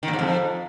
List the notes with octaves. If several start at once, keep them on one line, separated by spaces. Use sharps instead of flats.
D#3
A#2
G#2
F2